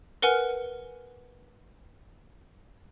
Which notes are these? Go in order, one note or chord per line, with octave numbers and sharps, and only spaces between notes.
A#4 B4 F#5 G#5 F6